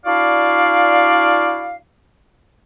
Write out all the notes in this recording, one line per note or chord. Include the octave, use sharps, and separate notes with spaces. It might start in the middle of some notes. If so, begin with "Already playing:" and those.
D4 E4 F#4 D5 F5